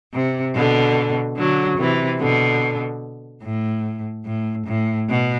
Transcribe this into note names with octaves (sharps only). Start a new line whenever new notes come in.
C3
B2 D3
D3 F#3
C3 E3
B2 D3
A2
A2
A2
B2